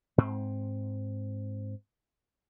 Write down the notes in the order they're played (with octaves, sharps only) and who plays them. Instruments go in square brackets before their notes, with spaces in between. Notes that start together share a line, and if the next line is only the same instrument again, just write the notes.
[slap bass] G#2 C4